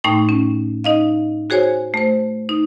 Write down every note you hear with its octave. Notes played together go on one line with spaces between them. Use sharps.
A2 A3 D#4 G5 C6
C#4
D#4 D#5 F5
F#4 G#4 C5 C#5 G#5
A3 C5
D#4